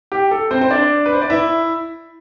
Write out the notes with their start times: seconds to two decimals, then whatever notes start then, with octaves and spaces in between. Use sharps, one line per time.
0.12 G4
0.31 A4
0.51 C4 C5
0.61 C5
0.71 D4 D5
1.06 B4
1.13 C5
1.22 D5
1.30 E4 E5